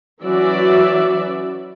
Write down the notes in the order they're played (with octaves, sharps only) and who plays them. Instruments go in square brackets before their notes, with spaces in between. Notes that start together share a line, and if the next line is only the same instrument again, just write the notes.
[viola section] E3 F#3 C#4 F#4 D5 E5